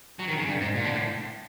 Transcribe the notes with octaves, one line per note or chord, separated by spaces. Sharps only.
F#3
D#3
C#3
G2
G#2
A#2
D3
A2